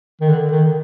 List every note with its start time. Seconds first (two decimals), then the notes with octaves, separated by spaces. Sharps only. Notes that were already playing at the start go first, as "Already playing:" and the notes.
0.21 D#3
0.29 D3
0.52 D#3